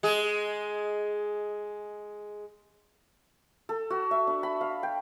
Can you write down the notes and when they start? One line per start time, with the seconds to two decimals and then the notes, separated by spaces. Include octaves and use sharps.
0.03 G#3 G#4
3.69 A4
3.90 F#4
4.11 E5
4.27 D4
4.43 B5
4.61 F5
4.83 G5